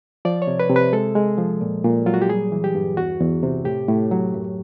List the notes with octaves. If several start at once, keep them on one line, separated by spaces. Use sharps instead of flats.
F3 D5
C#5
C3
B4
C3
B4
G#3 A4
G#3
F3
A#2
A#2
F#3 F4
F#4
G4
G3 G#4
E3
G4
G2
E2 F#4
E2
C3
A2 G4
A2
F#3
F#2